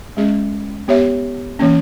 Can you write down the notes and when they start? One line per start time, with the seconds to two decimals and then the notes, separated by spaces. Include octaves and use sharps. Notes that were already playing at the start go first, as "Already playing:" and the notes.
0.17 G#3 C#4 G#4 D#5
0.88 B3 G4 C#5 E5
1.59 E3 A#3 C#4